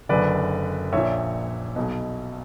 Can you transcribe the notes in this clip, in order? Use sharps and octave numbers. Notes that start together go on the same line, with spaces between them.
F#1 F#2 D3 B4 D5
A#1 A#2 C#5 E5
B1 B2